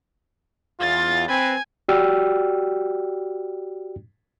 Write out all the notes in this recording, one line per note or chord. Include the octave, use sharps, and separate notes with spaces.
E2 F4 A6
C4 B4 G#5
F#4 G4 D5 G5 E6 F6